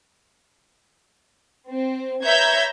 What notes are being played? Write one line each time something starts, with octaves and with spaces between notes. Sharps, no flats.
C4
B4 C#5 E5 A#5 G6 G#6